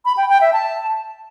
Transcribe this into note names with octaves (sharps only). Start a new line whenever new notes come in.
B5
G5
G5
E5
A5